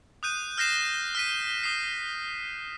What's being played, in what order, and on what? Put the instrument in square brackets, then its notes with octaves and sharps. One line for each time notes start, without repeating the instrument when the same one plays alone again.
[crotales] D#6 F#6 G6 D#7
F6 G6 A#6 C7 E7
F6 B6 D#7
D#6 C7